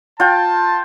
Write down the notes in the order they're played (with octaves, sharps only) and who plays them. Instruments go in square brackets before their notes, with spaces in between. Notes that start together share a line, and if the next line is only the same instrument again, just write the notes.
[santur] F4 G5 [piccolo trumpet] A5